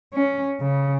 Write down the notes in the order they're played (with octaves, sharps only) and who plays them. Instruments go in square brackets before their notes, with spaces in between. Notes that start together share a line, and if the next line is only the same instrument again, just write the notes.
[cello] C#4
C#3